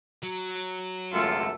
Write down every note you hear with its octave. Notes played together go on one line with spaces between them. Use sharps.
F#3
G#1 C#2 F#2 A3 F4 A4